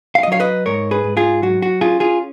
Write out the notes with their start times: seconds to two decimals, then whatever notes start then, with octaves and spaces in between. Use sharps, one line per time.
0.15 F5
0.23 D#5
0.28 F#3 C#5 F5
0.40 B4 D#5
0.66 G#2 A#4 C#5
0.91 G#4 B4
1.04 G#2
1.17 F4 G#4
1.42 F#3 F#4
1.62 F#4
1.81 C#4 F4 G#4
2.00 F4 G#4